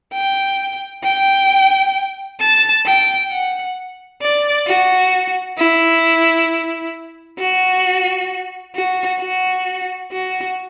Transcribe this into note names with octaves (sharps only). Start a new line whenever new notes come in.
G5
G5
A5
G5
F#5
D5
F#4
E4
F#4
F#4
F#4
F#4